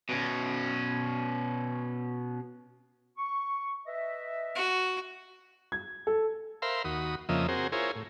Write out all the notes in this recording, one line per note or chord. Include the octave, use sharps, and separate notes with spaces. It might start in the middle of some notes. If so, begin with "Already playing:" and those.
B2 C#4
C#6
B4 D#5 E5
F#4
G#6
A4
A#4 C5 E5 F5 B5 C6
D#2 F#4 B5 D#6
F2 C#3 F3 A#3 D#5 E5
C4 F#4 G#4 A#4 C5
E4 F4 G#4 A#4 C5 C#5
A2